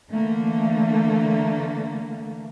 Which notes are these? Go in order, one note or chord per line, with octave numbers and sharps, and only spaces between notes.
D3 E3 A3 A#3